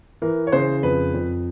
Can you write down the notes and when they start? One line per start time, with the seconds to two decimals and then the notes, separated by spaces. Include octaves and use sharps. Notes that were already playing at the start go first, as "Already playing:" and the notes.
0.22 E3 A#4
0.47 C#5
0.52 C#3 C5
0.83 F2 B4
1.14 F2